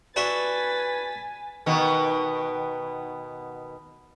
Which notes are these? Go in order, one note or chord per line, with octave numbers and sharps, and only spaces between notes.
D4 F#4 B4 E5 G#5 A6 B6
B2 D#3 B3